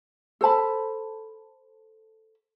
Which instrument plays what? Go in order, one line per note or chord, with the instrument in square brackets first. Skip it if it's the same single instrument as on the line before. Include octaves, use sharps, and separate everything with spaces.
[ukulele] A4 C5 A5 B5